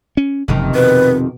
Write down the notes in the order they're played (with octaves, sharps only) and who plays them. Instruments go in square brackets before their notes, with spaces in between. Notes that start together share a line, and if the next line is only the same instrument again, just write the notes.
[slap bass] C#4
[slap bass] F#1 [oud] F2 C3 D#3
[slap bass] B2 [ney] B4